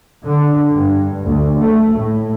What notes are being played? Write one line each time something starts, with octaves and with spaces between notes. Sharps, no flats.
D3
G2
D2
A3
A2